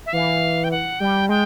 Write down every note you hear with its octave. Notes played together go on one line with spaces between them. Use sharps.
E5
E3 F5
G5
F#5
G3 G5
G#3 G5